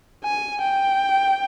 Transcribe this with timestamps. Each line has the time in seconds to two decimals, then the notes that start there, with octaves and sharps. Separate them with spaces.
0.25 G#5
0.62 G5